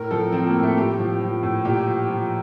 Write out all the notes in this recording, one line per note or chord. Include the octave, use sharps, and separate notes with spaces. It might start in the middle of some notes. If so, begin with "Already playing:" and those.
Already playing: A2 A#4
F3 A4
F3 C4
A#3
A2
A3
A2 G4
F3
F3
A2
A#2 G4
F3
F3